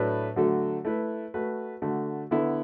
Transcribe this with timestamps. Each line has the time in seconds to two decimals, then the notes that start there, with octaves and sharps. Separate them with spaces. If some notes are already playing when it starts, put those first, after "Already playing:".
Already playing: A2 F#3 A3 D4 B4
0.36 D3 F#3 A3 F#4 A4
0.85 A3 E4 B4
1.34 A3 F#4 B4
1.82 D3 A3 F#4
2.31 D3 B3 E4 A4